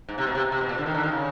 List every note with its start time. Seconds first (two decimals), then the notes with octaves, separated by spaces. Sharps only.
0.08 G#2
0.18 C3
0.27 B2
0.35 C3
0.52 C3
0.61 B2
0.69 A#2
0.78 D3
0.86 D#3
0.95 D3
1.03 D#3
1.12 C#3